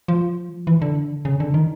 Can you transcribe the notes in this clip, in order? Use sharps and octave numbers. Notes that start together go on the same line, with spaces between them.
F3
E3
D3
C#3
D3
D#3